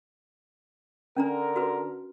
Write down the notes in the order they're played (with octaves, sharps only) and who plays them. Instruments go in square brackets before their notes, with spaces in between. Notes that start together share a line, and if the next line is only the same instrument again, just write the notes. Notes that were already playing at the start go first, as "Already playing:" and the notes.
[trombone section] D3 A#4 [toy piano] C#4 D4 A#5
[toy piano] F#4 B4